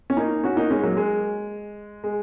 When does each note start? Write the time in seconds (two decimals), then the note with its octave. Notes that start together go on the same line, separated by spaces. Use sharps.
0.10 C#4
0.17 A#3 D#4
0.44 C#4 F#4
0.57 A#3 D#4
0.71 G#3 C#4
0.83 F#3 A#3
0.97 G#3
2.04 G#3